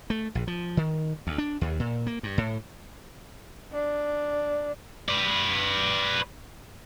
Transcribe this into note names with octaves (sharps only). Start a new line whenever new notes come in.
A3
A#1
F3
D#3
D2
D4
D#2
A#2
A#3
G2
A2
D4
B4 D5